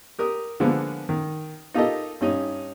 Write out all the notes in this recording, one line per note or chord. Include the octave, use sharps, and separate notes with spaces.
G4 A#4 D#6
D3 F3 G#3 A#3 B3
D#3
D#4 F4 G4 A4 A#4 D#5
G2 C#4 D#4